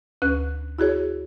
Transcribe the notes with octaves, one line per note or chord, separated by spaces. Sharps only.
D2 C#4 B4 F#6
E4 F#4 G#4 C#5